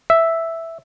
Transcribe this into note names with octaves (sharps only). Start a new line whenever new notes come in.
E5